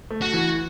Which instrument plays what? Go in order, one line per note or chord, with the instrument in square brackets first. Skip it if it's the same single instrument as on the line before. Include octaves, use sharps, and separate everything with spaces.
[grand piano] A3
[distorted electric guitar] F#4
[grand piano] E3